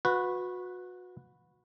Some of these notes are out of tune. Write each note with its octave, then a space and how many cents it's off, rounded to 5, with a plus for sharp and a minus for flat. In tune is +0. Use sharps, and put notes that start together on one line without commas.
F#4 -30 B4 +0